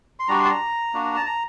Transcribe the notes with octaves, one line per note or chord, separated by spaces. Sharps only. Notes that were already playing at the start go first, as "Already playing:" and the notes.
C6
G3 D4 F#4 A#5
C6
A5
A#5
A#3 D4 F#4
A5
A#5